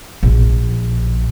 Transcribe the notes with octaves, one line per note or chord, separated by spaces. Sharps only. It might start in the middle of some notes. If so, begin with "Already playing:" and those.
A#1